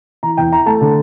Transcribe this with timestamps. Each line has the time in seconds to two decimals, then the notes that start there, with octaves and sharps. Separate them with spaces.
0.23 E3 A#5
0.37 E2 G5
0.52 E4 A#5
0.66 A3 A5
0.81 D3